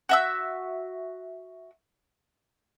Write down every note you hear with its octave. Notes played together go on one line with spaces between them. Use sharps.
F#4 E5 E6